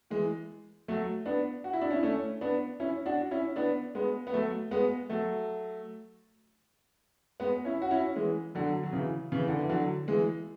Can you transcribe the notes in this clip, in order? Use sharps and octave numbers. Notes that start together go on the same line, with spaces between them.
E3 G#3
F#3 A3
B3 D4
F#4
E4
D4
C#4 E4
D4
A3 C#4
B3 D4
C#4 E4
D4 F#4
C#4 E4
B3 D4
G#3 B3
B3
F#3 A3
G#3 B3
F#3 A3
G#3 B3
C#4 E4
F#4
C#4 E4
E3 G#3
D3 F#3
F#3
C#3 E3
C#3 E3
D3
E3
D3 F#3
E3 G#3